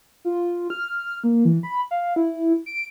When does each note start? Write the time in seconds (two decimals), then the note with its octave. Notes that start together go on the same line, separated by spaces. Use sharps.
0.25 F4
0.70 F6
1.24 A#3
1.45 E3
1.63 B5
1.91 F5
2.16 E4
2.66 D7